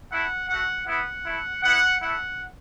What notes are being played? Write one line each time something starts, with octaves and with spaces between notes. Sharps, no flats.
A3 E4 F#5
A3 F#4 F#5
B3 E4 F#5
A3 E4
B3 E4 F#5
A3 E4 F#5